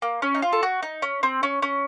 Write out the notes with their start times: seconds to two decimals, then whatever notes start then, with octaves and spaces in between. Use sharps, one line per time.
0.02 A#3
0.22 C#4
0.35 D#4
0.42 F4
0.53 A4
0.63 F#4
0.83 D#4
1.02 C#4
1.23 C4
1.43 C#4
1.62 C#4